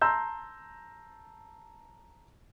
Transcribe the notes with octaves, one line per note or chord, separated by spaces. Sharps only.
A5 A#5 C6 E6 G6